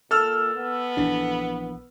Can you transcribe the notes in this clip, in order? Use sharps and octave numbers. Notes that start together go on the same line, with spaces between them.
A#2 A4 E6 F6
B3
A#1 E3 D4